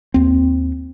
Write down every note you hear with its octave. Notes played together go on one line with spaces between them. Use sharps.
D#2 C4